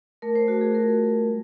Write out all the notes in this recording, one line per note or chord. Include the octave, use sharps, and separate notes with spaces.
A3 A#4
C5
A3 F#4
G#4
F4 A#4
G3
G#3